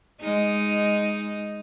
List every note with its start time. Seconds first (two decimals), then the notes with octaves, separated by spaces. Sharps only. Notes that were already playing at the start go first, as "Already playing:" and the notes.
0.21 G#3 D#4